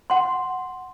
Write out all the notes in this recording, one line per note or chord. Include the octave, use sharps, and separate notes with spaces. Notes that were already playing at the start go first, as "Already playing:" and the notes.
F#5 C6